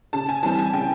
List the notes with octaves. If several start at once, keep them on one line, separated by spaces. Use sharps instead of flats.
C#3 A5
G#5
E3 G3 C4 A5
G#5
C#3 G5